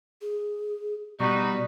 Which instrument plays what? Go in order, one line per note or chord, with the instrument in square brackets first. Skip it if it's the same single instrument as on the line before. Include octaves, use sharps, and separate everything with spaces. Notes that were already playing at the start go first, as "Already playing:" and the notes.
[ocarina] G#4
[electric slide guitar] B2 G3 [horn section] D#4 F#4 B4 [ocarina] D5